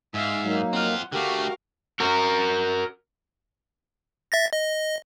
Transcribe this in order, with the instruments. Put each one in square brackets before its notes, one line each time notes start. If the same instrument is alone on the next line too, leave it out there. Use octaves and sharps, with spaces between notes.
[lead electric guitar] G#2 [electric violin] E5 F5
[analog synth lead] F#3 [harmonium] A#3 D#4
[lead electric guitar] C4 F4 [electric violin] F#5
[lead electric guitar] D3 A3 [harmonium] F#4 [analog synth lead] G4 [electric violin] A#4 F5
[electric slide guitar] F#4 A#4
[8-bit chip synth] E5 A6 A#6
D#5